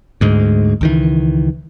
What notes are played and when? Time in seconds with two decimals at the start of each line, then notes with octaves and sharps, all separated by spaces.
0.21 D2 G#2 G#3
0.81 C#2 D#3 E3